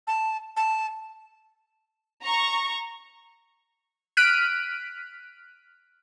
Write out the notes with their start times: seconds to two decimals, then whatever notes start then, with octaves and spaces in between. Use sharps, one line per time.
0.07 A5
0.57 A5
2.24 A#5 C#6
4.17 F6 F#6 B6 D7 D#7